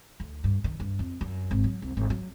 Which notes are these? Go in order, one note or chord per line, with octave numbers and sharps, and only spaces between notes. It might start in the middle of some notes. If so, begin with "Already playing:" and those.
D2
G2
D#3
G2
F2
F#2
G#1
F#3
C2
G#1
F#3